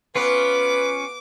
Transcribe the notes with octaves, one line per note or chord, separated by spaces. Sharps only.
B3 C#4 F4 B4 D6